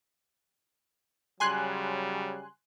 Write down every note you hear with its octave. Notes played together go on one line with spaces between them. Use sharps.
C#3 F#3 G3 G#5 C6 F#6